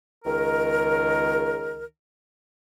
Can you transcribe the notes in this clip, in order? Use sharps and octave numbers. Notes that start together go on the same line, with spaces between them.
C#2 D#3 A#4